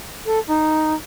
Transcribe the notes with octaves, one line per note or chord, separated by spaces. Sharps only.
A4
D#4